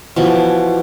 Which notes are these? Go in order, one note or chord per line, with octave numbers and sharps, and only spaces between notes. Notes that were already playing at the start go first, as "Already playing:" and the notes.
B2 E3 F3